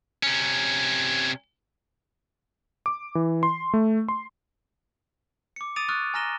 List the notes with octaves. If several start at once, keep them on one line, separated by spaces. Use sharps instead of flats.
C3 C#4
D6
E3
C6
A3
C6
D6 C#7
D6 D#6 A6 D7 D#7 F7
C#6 D#6 F6 F#6 A6
G#5 A#5 F6 A#6 E7 G7